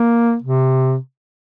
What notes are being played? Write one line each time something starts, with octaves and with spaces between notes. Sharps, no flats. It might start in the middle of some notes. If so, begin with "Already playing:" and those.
Already playing: A#3
C3